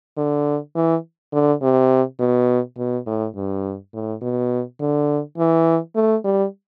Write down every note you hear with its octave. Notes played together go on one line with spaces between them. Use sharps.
D3
E3
D3
C3
B2
B2
A2
G2
A2
B2
D3
E3
A3
G3